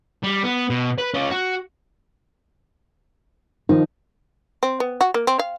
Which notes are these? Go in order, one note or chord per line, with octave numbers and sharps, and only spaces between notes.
G3
B3
B2
B4
C#4 F4
F#4
D#3 F3 D#4
C4
B3
F#4
A#3
C4
F5